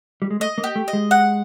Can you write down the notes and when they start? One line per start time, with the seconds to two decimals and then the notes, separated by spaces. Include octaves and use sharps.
0.22 G3
0.30 G#3
0.40 A3 D#5
0.58 A#3
0.64 G4
0.76 A3
0.88 D#5
0.93 G#3
1.11 F#5